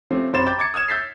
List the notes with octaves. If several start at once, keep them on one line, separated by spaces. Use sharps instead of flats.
C3 F3 A3 C4 C#4
F#2 C3 C5 B5 A6 E7
G5 A#5 B5 D6 G6 A6
D6 G#6 A6 C#7
D#6 F6 G#6 E7
E6 G6 A6 B6 C7